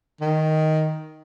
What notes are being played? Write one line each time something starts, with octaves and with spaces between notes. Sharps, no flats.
D#3